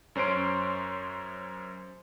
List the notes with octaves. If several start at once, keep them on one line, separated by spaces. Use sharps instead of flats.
F#2 C#4 C5 C6 D7